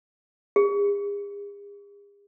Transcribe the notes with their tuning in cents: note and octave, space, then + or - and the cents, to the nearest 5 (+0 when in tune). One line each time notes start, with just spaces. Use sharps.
G#4 -45